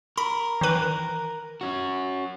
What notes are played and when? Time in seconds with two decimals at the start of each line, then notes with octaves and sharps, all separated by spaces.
0.17 A#4 B5
0.61 D#3 E3 B4
1.61 C#4 F#4